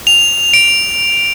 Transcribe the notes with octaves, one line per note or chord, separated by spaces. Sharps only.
F7
D7